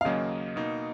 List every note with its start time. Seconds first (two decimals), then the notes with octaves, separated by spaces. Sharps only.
0.01 F5
0.05 D#2 C#3 F#3 A#3 C#4 D#5
0.56 B2 A#3 D#4